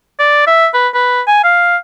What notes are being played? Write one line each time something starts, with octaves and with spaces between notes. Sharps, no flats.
D5
E5
B4
B4
G#5
F5